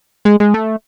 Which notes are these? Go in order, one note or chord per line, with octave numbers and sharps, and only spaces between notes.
G#3
G#3
A3